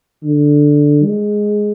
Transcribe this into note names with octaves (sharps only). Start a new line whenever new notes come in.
D3
G#3